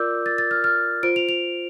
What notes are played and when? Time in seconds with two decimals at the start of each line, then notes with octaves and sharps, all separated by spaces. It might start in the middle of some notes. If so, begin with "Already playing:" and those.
Already playing: F4 A#4 D5 D6 E6 G6
0.26 A6
0.38 A6
0.51 F6
0.64 F6
1.03 F4 C5 D7
1.16 F7
1.29 F7